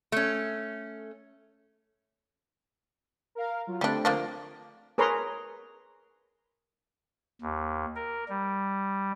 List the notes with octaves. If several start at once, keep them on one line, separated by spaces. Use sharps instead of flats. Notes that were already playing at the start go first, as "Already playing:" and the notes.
A3 C#4
A#4 F5
F#3 F4
D3 G3 A3 C4 D4
F3 A#3 D4
G#4 A#4 B4 C#5 A#5 C6
D#2
A#4
G3